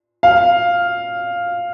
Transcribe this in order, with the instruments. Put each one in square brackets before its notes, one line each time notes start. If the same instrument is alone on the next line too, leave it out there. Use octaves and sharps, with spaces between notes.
[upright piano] F5